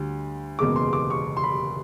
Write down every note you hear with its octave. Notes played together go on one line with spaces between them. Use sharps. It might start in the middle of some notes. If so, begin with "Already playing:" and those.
Already playing: D2 D3 G3
F#1 E2 B2 G#3 D6
C6
D6
C#6
C6
B5